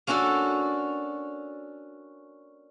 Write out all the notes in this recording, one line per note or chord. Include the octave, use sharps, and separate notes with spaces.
A#3 C#4 D4 F#4 A4